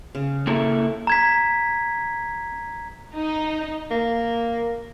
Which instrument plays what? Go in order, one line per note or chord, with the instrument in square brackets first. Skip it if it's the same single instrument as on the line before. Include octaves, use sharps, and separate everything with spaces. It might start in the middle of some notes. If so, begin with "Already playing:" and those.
[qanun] C#3
[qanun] C#3 [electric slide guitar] A#3 E4 A4
[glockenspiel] A#5 G#6 B6
[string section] D#4
[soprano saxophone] A#3